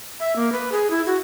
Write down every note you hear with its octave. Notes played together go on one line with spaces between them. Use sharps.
E5
A#3
B4
G#4
E4
F#4